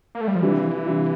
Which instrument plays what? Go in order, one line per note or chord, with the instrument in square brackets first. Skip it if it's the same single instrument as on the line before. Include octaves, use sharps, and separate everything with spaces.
[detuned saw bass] A#3
A3
G3
F3
[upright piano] C3 G3 D4 F4 [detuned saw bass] E3
[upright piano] C3 G3 D4 F4